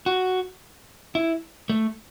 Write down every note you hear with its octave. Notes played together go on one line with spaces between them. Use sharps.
F#4
E4
A3